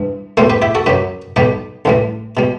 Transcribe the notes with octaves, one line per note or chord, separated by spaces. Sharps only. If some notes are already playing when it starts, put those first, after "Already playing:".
Already playing: G2 E3
B1 A2 G3 A4 C5
G4 B4
E4 G4
F#4 A4
F#2 F#3 G4 B4
B1 B2 G3 G4 B4
A1 A2 E3 G3
B2 G3